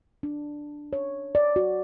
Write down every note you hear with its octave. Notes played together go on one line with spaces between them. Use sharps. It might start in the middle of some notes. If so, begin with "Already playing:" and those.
D4
C#5
D5
F#4